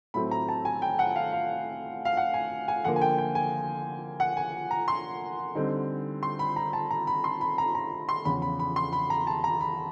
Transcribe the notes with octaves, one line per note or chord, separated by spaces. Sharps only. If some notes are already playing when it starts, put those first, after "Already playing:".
A2 F#3 A3 C4 B5
A#5
A5
G#5
G5
F#5
F5
F5
F5
F#5
G#5
G#5
D3 F3 A#3 F#5
G#5
G5
G5
G#5
F#5
G#5
A#5
C6
D3 G3 C4 D#4
C6
B5
A#5
A5
A#5
B5
C6
B5
A#5
A#5
C6
E2 C#3 F3 B5
B5
B5
C6
B5
A#5
A5
A#5
B5